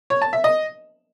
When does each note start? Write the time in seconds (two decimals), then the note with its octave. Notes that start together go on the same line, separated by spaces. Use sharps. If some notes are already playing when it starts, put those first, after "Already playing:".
0.10 C#5
0.22 A5
0.33 E5
0.44 D#5